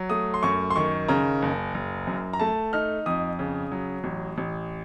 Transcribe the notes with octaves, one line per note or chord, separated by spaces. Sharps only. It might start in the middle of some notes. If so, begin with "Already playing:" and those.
Already playing: F#3
A3 D#6
C6
F#2 C#6
C6
D#3 C#6
C#3 A#5
F#1
F#1
F#2
A#5
A3 A5
D#4 F6
F2 D#6
C#3
F#3
A1
A1